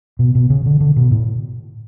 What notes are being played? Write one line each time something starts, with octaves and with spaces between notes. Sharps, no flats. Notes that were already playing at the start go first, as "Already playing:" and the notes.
B2
B2
C#3
D3
D3
B2
A2